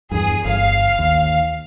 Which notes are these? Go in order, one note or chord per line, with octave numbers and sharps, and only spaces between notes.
E2 G2 G#4
G1 F5
D#2